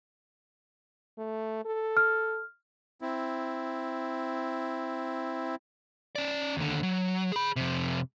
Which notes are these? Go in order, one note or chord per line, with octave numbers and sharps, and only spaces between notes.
A3
A4
F6
C4 E4
C#4 D5
D#2 D3
F#3
G#4 B5
F2 C3